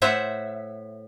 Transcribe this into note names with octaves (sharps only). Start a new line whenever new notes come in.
A2 C5 E5 F#5